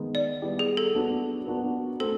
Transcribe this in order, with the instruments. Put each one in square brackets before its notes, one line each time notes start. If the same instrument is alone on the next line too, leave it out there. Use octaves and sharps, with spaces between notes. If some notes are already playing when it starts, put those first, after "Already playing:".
Already playing: [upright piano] D#3 G#3 B3
[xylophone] D5
[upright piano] G3 B3 E4 G4
[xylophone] G#4
A4
[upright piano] F#3 B3 D4 F#4
B3 D4 F#4 A#4
[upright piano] A3 C4 [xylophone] A4